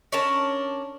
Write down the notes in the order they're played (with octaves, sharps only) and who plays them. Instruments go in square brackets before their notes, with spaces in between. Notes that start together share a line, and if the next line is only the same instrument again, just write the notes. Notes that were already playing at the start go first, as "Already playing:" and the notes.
[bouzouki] C#4 D4 A#4 A5